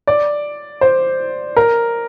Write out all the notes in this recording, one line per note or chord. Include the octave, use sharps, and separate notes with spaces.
D5
C5
A#4